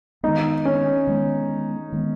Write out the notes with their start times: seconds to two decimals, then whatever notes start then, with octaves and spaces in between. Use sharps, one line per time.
0.23 D#3 G#3 B3 D#4
0.65 C#4
1.07 D#3 G#3 B3
1.92 D#3 G#3 B3